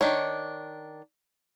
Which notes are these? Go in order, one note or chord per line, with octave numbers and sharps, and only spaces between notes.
D#3 D4 C#5